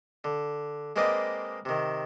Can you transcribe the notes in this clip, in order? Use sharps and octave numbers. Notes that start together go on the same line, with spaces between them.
D3
G#3 A#3 C4 B4 D5 D#5
C3 D#3